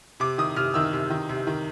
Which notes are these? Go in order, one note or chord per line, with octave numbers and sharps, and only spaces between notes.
C3 D6
D#3 D#6
C3 F6
D#3 E6
C3
D#3
C3
D#3